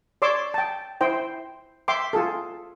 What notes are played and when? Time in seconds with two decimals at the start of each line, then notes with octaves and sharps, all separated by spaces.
0.22 C#5 D5 C6 D6 E6
0.54 G5 A5
1.01 E4 C5 G5
1.88 E5 G5 C6 D6
2.13 F4 G#4 A4